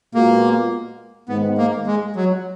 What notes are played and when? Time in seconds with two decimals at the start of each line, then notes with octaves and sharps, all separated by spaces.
0.14 A#2 G#3 A#3 B3 F#4
1.29 G#2 D#3 G#3 B3
1.58 A#3
1.87 G#3
2.16 F#3